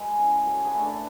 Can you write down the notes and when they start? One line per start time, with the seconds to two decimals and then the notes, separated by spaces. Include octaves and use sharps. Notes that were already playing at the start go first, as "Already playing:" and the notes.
Already playing: G#3 F#4 G#4 B4
0.18 C#4 E4
0.46 F#3 A4 C#5
0.65 G#4 B4
0.74 A3 D4
0.84 B4 D5